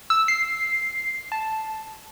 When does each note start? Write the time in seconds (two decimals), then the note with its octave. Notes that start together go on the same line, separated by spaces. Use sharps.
0.10 E6
0.28 C7
1.32 A5